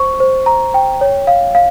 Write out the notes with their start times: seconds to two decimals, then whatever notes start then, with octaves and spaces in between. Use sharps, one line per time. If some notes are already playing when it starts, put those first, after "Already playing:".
Already playing: C5 C#6
0.20 C5
0.46 A#5
0.74 G5
1.01 C#5
1.27 F5
1.55 F5